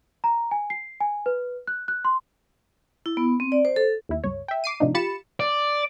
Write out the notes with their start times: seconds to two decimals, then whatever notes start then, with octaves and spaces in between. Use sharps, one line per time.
0.24 A#5
0.51 G#5
0.70 C7
1.00 G#5
1.26 B4
1.67 F#6
1.88 F#6
2.05 C6
3.06 E4
3.17 B3
3.40 C4
3.52 D5
3.65 C5
3.76 A4
4.09 D#2 E4
4.24 G1 C#2 C#5
4.48 E5 G5
4.64 D6 C7 D#7
4.80 A2 C3 F3 D4 D#4
4.94 F4 G4 B5 A6 C#7 E7
5.40 D5